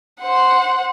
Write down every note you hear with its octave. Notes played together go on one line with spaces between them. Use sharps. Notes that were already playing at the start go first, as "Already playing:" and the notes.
C5 F#5